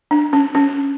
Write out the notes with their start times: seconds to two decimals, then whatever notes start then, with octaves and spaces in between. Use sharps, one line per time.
0.11 D4
0.33 C#4
0.55 C#4